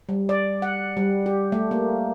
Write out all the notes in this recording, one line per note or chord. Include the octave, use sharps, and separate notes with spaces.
G3
D5
F#5
G3
G4
A3
A#3